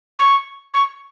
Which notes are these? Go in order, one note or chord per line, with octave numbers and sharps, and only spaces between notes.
C#6
C#6